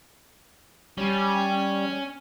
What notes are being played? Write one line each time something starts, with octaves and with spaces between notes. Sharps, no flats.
G3 C#4